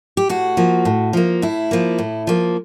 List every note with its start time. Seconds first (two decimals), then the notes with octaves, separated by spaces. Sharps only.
0.17 G4
0.29 A2 F#4
0.57 F3 A#3
0.85 A2
1.13 F3 A#3
1.42 A2 E4
1.71 F3 A#3
1.99 A2
2.27 F3 A#3